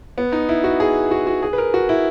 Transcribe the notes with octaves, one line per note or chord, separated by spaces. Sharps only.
B3
D#4
E4
F#4
G#4
F#4
F#4
G#4
B4
A#4
F#4
E4